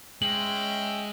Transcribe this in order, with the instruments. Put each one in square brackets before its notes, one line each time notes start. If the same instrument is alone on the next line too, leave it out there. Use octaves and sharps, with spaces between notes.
[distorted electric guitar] G#3 [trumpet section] C#4 E5 G5 [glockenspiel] F#7